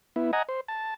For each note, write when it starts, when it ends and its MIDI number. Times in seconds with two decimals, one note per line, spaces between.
0.16 0.31 59
0.16 0.31 64
0.33 0.42 75
0.33 0.42 78
0.33 0.42 80
0.33 0.42 82
0.49 0.61 72
0.68 0.94 81